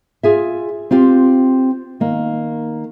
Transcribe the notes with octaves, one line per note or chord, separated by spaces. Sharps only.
F4 G#4 E5
C4 F4 G4
D#3 A#3